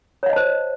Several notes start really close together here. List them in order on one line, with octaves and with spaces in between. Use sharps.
C#5 F5 D#5 A5 C5